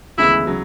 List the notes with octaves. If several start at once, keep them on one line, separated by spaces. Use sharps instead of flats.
D2 C#3 E3 G#3 B3 E4
C#3 F#3